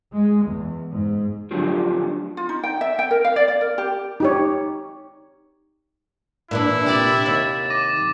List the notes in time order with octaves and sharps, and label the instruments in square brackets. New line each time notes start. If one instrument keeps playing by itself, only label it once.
[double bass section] G#3
E2
G#2
[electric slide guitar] A2 D3 F3 F#3 F4 G4
[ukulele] F4
D#4
G5
E5
G5
A#4
F5
D5
D5
A#4
G4
[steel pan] D#4 G4 C#5
[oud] A#2 E3 D4 [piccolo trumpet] E4
[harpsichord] C3 D5 [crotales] A6 E7
[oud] D#2 [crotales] A6
[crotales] D6 A#6 D#7